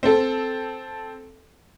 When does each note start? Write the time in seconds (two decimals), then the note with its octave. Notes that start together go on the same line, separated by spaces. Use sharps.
0.03 C4 A4